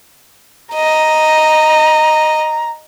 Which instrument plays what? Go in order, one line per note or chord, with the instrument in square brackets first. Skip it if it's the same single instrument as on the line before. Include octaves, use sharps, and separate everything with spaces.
[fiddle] D#5 [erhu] A#5